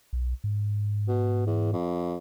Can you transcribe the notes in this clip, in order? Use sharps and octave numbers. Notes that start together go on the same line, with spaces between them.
B1
G#2
B2
E2
F2